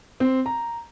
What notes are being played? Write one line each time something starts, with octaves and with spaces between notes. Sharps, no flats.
C4
A#5